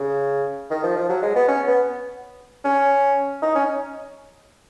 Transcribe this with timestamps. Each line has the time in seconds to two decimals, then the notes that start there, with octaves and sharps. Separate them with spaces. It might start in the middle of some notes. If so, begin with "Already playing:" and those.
Already playing: C#3
0.70 D#3
0.83 F3
0.96 F3
1.09 F#3
1.22 G#3
1.36 B3
1.48 C#4
1.67 B3
2.64 C#4
3.42 D#4
3.55 C#4